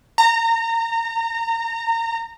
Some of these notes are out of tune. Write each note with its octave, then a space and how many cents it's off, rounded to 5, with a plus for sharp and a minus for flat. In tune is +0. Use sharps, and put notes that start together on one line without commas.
A#5 -25